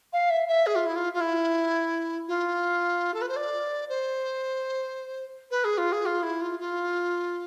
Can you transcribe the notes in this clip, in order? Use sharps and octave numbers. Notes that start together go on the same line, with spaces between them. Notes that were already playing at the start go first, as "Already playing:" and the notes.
F5
E5
E5
G#4
F4
E4
F4
F4
E4
F4
A4
B4
C5
D5
C5
B4
G#4
F4
G#4
F4
E4
F4
F4